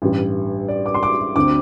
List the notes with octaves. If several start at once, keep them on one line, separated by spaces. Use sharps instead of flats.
A1 G2 G3
D5
D6
C6
D6
D2 D3 C4 D6